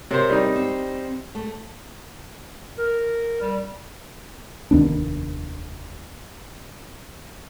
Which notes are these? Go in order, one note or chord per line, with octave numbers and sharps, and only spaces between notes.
C3 C4 A#4 C5 C#5
G3 D#4
C4
A3
A#4
G3
F1 D#2 B3 D4